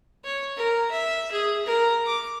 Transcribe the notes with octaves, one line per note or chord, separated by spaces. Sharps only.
C#5
A#4
E5
G#4
A#4
D6